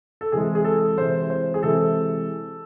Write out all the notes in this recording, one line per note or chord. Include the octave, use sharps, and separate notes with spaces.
A4
C3 E3 G#3 G#4
G#4
A4
C3 E3 G#3 C5
C5
G#4
C3 E3 G#3 A4